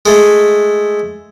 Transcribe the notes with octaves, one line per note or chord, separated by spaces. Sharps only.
G#3 A3